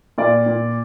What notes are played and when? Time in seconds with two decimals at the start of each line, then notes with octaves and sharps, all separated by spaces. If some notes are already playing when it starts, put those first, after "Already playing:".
0.18 A#2 D5
0.46 A#2